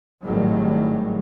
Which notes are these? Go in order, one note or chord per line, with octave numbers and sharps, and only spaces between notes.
G#1 A2 D#3 F#3 G3